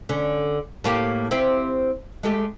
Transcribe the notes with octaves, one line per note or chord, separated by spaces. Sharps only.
D3 C#4
A2 A#3 G4
C4 E4 G4
G#3 A3 G4